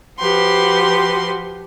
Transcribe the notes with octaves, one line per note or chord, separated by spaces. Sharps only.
F3 F#4 G4 B4 C6